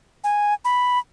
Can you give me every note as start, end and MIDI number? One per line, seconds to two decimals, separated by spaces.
0.24 0.54 80
0.65 0.99 83